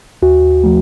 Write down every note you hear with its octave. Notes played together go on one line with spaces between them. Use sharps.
D#2 F#4
F3 A3